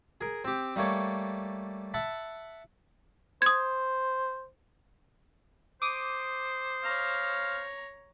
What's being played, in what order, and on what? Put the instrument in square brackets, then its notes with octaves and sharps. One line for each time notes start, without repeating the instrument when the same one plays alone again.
[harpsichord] G#4 A#4
C4 G4
G3 A3 A#3 C#5
E5 F#5 A5 B5
[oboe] C5 [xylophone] D#6 G#6
[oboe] C5 [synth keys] D6 D#6
[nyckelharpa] C#5 A#5 [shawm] F5